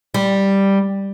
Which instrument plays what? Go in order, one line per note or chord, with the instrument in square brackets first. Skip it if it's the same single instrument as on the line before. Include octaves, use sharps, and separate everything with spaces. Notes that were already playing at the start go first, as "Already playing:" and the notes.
[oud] G3